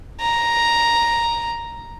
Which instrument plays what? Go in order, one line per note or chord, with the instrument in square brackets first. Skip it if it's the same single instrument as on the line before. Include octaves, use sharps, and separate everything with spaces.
[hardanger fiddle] A#5